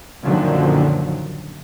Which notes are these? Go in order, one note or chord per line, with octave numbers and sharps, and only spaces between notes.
F#2 A#2 D3 D#3 F3 F#3